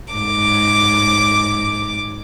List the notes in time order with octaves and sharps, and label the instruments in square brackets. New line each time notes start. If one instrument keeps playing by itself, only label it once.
[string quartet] G#2 D6